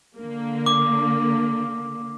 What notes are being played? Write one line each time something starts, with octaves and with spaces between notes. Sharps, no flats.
D3 A#3
D6